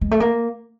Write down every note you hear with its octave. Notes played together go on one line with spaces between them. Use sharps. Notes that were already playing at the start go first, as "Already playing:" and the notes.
G#3
A3
A#3